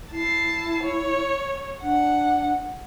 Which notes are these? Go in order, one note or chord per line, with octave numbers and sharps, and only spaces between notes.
E4 A5 C7
C#5
D4 F#5